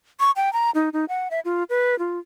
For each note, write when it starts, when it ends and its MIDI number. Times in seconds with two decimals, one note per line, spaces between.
0.20 0.31 85
0.36 0.52 79
0.53 0.71 82
0.75 0.89 63
0.93 1.05 63
1.09 1.28 78
1.31 1.40 76
1.45 1.63 65
1.70 1.98 71
1.99 2.19 65